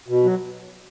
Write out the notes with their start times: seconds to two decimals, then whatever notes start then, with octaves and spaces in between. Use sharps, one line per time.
0.08 B2
0.24 F#3